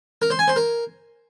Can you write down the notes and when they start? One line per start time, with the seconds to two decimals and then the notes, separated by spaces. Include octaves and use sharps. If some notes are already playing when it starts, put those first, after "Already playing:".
0.22 A#4
0.30 C5
0.39 G#5
0.48 C5
0.56 A#4